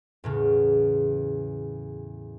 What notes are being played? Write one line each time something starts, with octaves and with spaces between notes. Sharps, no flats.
E2 A2 C#3